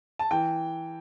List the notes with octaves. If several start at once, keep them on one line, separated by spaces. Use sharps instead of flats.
A5
E3 G5